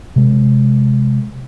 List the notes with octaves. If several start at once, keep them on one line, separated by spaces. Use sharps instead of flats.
C3 G#3